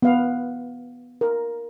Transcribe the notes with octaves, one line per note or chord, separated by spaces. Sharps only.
B3 F5
A#4